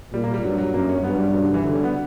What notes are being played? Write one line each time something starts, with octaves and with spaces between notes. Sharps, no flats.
A#2 G3
A#3
G3
G2 F#3
F#3
F#2 A#3
C#4
G2 B3
G3
F#3
D3
E3
D3 F#3
G3
B3